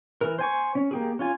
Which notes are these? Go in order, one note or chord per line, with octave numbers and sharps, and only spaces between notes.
E3 A#4
C5 G#5 C#6
C#4
A#3 G4 G#4
C#4 F4 G#5